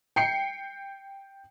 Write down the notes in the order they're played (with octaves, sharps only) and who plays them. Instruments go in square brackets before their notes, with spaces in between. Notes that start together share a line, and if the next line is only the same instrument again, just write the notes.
[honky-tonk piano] G5 C7 C#7